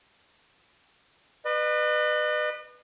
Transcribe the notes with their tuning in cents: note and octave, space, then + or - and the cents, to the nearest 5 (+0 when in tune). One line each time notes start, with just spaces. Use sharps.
B4 +0 D#5 -45